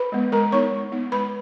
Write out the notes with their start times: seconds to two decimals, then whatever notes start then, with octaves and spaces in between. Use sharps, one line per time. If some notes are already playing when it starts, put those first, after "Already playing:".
Already playing: B4 B5
0.12 G#3 B3
0.32 G#3 A#4 A#5
0.52 B3 D#4 C#5 C#6
0.72 G#3
0.92 B3 D#4
1.12 G#3 B4 B5